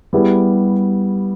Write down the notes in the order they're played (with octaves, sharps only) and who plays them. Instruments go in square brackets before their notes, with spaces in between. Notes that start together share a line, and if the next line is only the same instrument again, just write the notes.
[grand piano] G3 B3 E4 G#4